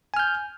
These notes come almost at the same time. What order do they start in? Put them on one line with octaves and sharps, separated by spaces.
G#5 F6 G6